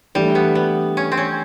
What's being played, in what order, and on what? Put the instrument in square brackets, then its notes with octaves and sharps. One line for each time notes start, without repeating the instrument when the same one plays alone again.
[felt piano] E3 A3 D4 G4 [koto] G3
[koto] B3
B3
C#4
C4
C#4